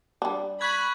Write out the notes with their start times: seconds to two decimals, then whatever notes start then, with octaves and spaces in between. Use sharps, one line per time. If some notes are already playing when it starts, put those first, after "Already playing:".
0.22 G3 D4
0.61 B5 C#6 F#6 G#6